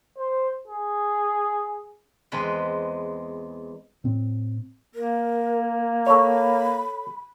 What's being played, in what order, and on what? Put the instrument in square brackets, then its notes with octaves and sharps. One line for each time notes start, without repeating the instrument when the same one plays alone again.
[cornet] C5
G#4
[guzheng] E2 G#3 C4 B4
[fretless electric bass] A2 C4
[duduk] A#3 [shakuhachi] A#4
[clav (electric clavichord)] A4 C#5 [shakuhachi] B5